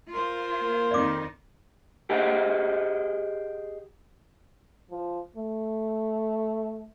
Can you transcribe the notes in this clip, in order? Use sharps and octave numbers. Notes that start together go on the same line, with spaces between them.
F4 A#4 C5
A#3
F2 D#3 D#4 D5 D6
G4 G#4 C5 D#5 F#5 G5
F3
A3